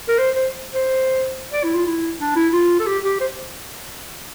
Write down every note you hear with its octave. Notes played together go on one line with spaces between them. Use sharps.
A#4
C5
C5
C5
D5
E4
F4
E4
D4
E4
F4
A4
G4
G4
C5